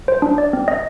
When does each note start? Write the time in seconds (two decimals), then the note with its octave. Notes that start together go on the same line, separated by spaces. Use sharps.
0.08 C5
0.22 D4
0.38 D5
0.53 C4
0.68 D#5